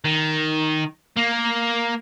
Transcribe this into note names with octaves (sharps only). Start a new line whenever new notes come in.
D#3
A#3